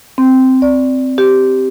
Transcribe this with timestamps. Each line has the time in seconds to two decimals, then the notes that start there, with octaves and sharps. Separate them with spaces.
0.18 C4
0.62 D5
1.18 G4